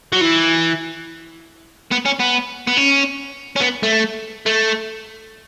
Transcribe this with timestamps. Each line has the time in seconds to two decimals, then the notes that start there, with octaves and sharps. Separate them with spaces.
0.12 F#3
0.21 E3
1.91 B3
2.05 C#4
2.19 B3
2.67 B3
2.77 C#4
3.56 C#4
3.61 B3
3.83 A3
4.46 A3